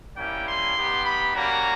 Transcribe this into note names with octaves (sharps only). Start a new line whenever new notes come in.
G3 A#3 C#4 E4 G5
C6
B3 D#4 G4
B5
G3 A#3 C#4 F#4 A#5